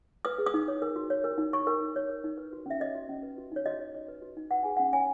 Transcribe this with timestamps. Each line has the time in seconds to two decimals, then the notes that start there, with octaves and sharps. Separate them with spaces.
0.25 B4 D#6
0.38 G#4
0.46 D#6
0.54 D#4
0.68 C#5
0.82 A#4
0.96 F#4
1.10 C#5
1.24 A#4
1.38 D#4
1.53 C#5 C#6
1.67 A#4
1.81 D#4
1.96 C#5
2.10 A#4
2.24 D#4
2.38 B4
2.53 F#4
2.66 C#4 E5
2.80 C#5 D#5
2.95 F#4
3.09 C#4
3.23 B4
3.38 F#4
3.52 D#4 C#5
3.66 F#4 D#5
3.80 C#5
3.94 C#5
4.08 B4
4.22 F#4
4.37 D#4
4.51 B4 F#5
4.63 G#4 G#5
4.76 C#4 F#5
4.93 C#5 G#5